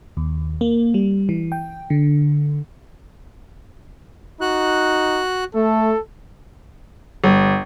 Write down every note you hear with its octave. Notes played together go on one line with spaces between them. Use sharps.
D#2
A#3
G3
E3
G5
D3
D#4 F#4 F#6
A3 A4
G1